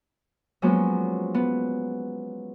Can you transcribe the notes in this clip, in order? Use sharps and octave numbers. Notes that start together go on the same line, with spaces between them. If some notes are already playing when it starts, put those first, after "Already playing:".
F3 F#3 G#3 A#3 B3 C#4
B3